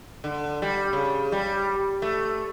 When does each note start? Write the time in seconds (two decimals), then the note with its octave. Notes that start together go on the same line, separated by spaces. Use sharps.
0.24 D3
0.62 G3
0.93 C#3
1.32 G3
2.02 A3